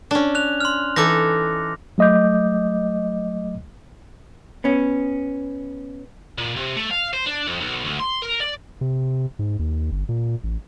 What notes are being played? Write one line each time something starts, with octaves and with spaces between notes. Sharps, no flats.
C#4 D4
F#6 F7
C6 F6
E3 D#4 A4 D6 A#6
F#3 A3 D#5 D6 G6
B3 C#4
A#2
C3
A3
F5
C5
D4
F2
B1
D2
C6
A#4
D5
C3
G#2
D#2
G1
A#2
A1